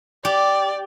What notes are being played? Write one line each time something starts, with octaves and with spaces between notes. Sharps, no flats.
G4 D5